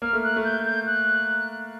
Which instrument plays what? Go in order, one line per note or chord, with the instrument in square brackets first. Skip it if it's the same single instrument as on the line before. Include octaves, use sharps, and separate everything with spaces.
[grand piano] A#3 [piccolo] F6
[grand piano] A3
[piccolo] F#6
[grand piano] A3
[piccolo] G6
G6
F#6